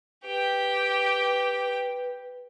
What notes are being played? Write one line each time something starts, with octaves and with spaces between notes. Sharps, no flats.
G4 B4 G5